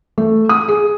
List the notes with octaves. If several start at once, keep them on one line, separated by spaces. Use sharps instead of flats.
A3
D#6
G#4